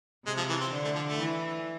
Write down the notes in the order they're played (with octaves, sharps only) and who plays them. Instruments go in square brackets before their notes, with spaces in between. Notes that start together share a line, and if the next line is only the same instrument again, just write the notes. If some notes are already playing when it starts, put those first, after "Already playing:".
[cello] C3 [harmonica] G#3
[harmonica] F3
E3
C4
[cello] D3
[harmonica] A3
F3
A3
[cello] E3